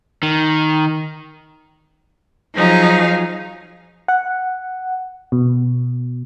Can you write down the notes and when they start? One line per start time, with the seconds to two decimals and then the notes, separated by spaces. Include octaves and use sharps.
0.23 D#3
2.56 F3 F#3 D#4 G#4 F5
4.08 F#5
5.32 B2